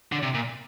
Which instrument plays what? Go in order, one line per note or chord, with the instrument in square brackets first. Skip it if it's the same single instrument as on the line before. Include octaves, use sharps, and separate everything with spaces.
[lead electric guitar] D3
C3
A#2